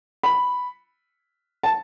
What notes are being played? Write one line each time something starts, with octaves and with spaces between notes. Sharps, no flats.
B5
A5